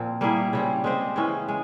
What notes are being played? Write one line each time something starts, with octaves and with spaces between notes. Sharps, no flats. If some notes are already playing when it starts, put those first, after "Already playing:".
Already playing: A#2 F3 C4 F4
G3 A#3 E4 G#4
C#3 G3 C4
G#3 C4 G4 C5
C#3 E3 G#3 C#4
G#3